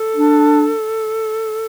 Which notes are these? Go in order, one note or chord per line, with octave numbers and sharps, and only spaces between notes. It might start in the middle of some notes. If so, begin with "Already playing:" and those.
Already playing: A4
D4